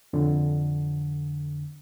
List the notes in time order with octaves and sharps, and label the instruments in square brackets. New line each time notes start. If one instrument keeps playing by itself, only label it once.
[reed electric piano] F2 D3